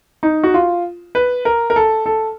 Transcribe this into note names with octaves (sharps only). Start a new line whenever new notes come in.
D#4
F#4
F4
B4
A#4
A#4
A4
A4